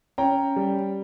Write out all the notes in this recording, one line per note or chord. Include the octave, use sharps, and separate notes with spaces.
C#4 G5 A#5
G3